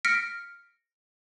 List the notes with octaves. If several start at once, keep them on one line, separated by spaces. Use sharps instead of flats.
F6 A#6 B6 C#7 D7